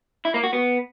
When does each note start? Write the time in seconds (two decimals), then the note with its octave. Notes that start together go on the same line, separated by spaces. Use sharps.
0.25 E4
0.34 A#3
0.44 F#4
0.53 B3